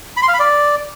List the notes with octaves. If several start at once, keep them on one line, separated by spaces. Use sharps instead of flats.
B5
C6
F5
B5
D5